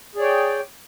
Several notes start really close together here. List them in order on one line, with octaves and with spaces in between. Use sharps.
G#4 D5 C#5 G5